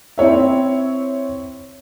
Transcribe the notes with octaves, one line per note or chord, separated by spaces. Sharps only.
C4 E4 C#5 E5